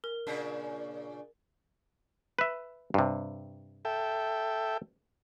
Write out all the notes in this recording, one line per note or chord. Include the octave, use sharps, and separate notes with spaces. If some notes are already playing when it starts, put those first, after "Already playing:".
A#4
A#2 C#3 D4
B4 E5
G2 C3
A4 E5 G5